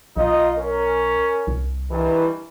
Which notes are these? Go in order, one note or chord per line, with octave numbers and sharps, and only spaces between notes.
B1 D#4 F4 D#5
C#4 A#4
C2
G2 D#3 E3